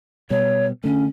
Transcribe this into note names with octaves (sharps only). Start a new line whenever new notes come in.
B2 G3 C#5
D3 A3 C#4